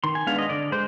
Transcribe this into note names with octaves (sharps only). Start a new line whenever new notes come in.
D#3 C6
G#5
G#3 B3 D4 F5
D#5
D3 D5
G#3 C5